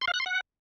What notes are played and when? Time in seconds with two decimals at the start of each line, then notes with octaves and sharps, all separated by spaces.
0.01 C6
0.08 F5
0.14 F#6
0.20 C6
0.26 F#5